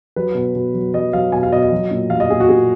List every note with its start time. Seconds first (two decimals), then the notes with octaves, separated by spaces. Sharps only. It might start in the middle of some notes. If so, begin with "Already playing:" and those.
0.16 F#3 B4
0.35 B2
0.55 B2
0.74 F#3
0.94 F#3 D#5
1.13 F#3 F5
1.32 B2 G#5
1.43 F5
1.51 B2 D#5
1.62 D#5
1.72 F#3
1.91 A#2
2.10 F#3 F5
2.20 D#5
2.30 A#2 G#4
2.40 F#4
2.49 A#2 G#4